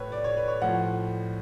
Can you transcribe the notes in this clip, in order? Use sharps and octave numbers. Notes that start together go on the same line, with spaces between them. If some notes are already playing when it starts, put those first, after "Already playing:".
Already playing: A2 B4 C#5
D5
C#5
B4
C#5
A2 F3 F#5